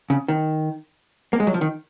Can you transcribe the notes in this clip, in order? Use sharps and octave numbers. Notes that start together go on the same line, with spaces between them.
C#3
D#3
A#3
G#3
F#3
F3
D#3